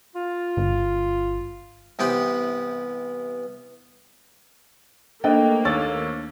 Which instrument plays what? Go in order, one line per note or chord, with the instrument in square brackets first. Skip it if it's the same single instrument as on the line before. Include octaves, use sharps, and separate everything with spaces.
[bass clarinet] F4
[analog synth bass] G1
[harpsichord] C2 E3 B3 G4 C5 B5
[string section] A3 A#3 [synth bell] D4 A4 C5 [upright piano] D#5 G5
[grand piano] D#2 E6 A6 [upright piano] C#5